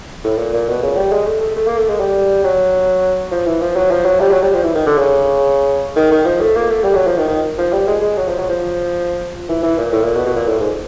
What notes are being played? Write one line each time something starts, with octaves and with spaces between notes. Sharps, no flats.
A2
A#2
A#2
B2
C#3
G3
G#3
A3
A3
A3
A#3
A3
G#3
G3
F#3
F3
E3
F3
F#3
F3
F#3
G3
F#3
G3
F3
E3
D#3
D3
C#3
D#3
D#3
F3
A3
A#3
A3
G3
F#3
F3
D#3
D#3
F3
G3
G#3
G#3
F#3
F3
F#3
F3
E3
E3
A#2
A2
A#2
B2
B2
A#2
A2
G#2